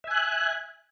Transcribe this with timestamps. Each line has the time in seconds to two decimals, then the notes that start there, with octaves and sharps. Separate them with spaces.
0.04 E5
0.07 G#5
0.11 F#6